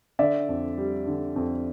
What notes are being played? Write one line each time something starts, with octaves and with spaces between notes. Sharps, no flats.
D3 D5 E5
F2
G3
D3
F2